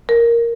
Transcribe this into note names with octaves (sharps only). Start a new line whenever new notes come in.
A#4